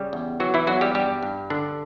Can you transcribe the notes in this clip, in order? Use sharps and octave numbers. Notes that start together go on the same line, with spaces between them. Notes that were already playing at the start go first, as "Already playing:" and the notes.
Already playing: C#3 G3 G4
E2
E3 F#3 F#4
E3 E4
E2 F#3 F#4
G3 G4
G2 G3 G4
G2
D3 D4